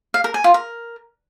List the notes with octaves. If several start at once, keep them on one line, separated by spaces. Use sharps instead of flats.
F5
A#4
G#5
F4
A#4